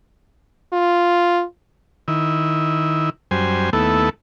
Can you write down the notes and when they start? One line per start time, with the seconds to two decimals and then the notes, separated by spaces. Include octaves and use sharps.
0.73 F4
2.08 D#3 E4
3.31 F#2 G3 C5 G#5
3.73 D#2 A3 B3 E4 A4